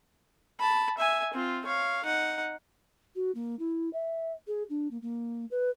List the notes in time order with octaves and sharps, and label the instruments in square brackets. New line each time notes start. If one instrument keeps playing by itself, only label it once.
[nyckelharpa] A5 B5
E5 G#5
C4 F4
C#5 F5
D#4 F#5
[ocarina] F#4
A#3
E4
E5
G#4
D4
A#3
A#3
B4